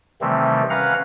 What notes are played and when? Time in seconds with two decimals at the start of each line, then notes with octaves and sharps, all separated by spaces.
0.21 C3 D#3 E3 G3 A3 C4
0.70 C#4 B4 F5 F#5 A#5